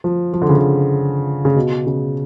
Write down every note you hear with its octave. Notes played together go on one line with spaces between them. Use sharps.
F3
F3
D3
C#3
D3
C#3
B2
C#3